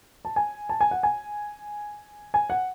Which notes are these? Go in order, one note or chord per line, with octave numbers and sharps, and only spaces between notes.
A5
G#5
A5
G#5
F#5
G#5
G#5
F#5